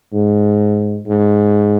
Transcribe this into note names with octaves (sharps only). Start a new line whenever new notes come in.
G#2
G#2